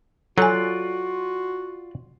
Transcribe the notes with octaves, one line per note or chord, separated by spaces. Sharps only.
F#3 F4 F#4 A4 D5 G#5 F#6